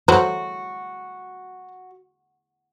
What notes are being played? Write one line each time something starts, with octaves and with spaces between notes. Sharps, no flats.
F#3 A3 F#4 C5